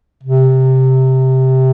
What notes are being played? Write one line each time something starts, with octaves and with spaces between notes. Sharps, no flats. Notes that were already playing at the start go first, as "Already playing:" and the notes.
C3